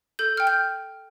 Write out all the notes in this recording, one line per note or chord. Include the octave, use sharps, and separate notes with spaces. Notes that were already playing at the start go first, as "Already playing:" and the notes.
A4 G6
G5 F6
G6